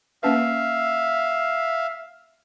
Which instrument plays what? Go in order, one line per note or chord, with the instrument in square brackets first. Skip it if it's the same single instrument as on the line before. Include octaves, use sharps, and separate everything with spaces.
[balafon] A#3 C#4 B4 [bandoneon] E5 F5